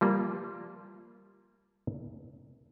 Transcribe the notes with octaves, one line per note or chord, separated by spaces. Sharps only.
F3 G3 A#3 F4